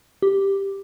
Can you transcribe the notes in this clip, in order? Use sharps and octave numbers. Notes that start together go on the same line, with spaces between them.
G4